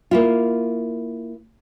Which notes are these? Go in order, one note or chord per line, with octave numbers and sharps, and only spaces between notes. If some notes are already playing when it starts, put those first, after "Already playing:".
A#3 E4 F4